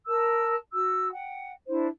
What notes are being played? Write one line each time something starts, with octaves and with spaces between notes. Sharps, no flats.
A#4 A5 E6
F#4 E6
F#5 G5
D4 E4 C5